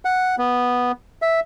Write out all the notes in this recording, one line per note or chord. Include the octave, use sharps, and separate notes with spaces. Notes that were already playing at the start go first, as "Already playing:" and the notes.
F#5
B3
E5